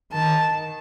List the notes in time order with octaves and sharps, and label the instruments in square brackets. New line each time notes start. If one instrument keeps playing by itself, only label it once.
[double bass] D#3 [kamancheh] A5